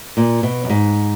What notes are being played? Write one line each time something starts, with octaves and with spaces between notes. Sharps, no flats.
A#2
B2
F#2
G#2